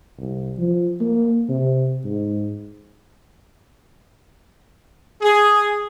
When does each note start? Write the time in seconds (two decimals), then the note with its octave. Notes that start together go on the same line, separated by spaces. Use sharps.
0.18 C2
0.58 F3
1.01 A#3
1.49 C3
2.05 G#2
5.22 G#4